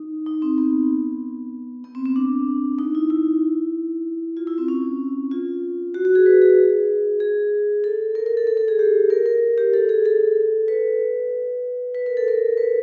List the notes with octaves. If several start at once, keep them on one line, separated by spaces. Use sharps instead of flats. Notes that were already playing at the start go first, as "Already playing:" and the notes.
Already playing: D#4
D#4
C4
B3
B3
C4
C4
D4
D#4
E4
E4
F4
E4
C4
C#4
F4
F#4
F#4
G#4
B4
G#4
G#4
A4
A#4
A#4
A4
A4
A4
G#4
G4
A#4
A#4
G4
A4
G#4
A4
B4
B4
A#4
A4
A#4
B4